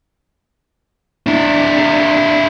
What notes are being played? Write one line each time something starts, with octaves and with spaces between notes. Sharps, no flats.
D4 E4